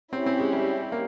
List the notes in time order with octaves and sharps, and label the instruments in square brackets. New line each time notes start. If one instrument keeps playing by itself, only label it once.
[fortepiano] C4 [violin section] C#4 E4 G4
[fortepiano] C4
G#3
G3
A#3